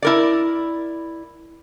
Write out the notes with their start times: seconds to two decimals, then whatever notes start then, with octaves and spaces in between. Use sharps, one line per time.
0.02 E4 A#4 D5